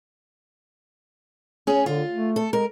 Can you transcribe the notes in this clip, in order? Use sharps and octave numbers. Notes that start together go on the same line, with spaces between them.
C#4 G#4
D3 F4
A3
A4
G#3 A#4